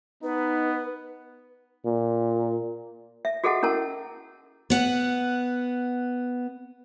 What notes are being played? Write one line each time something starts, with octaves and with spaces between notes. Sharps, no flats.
B3 D#4 B4
A#2
E5
F#4 G#4 A4 D#5 F#5 A5
C#4 E4 A#4 A5
B3 F#5